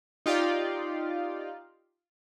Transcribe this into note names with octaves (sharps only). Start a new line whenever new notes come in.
D#4 F4 G4 D5 F5